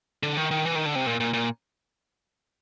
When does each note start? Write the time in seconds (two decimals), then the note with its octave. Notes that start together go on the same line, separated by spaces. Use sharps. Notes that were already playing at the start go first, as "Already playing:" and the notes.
0.23 D3
0.37 D#3
0.51 D#3
0.65 E3
0.75 D#3
0.86 D3
0.95 C3
1.06 A#2
1.20 A#2
1.34 A#2